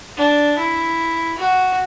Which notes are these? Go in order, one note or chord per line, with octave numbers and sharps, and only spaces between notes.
D4
E4
F#4